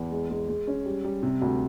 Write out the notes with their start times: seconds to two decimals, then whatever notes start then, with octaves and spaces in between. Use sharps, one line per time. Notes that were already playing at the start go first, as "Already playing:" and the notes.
Already playing: E2
0.12 G#3
0.30 G#3
0.49 G#3
0.67 C#4
0.86 G3
1.04 G3
1.23 C3
1.42 D2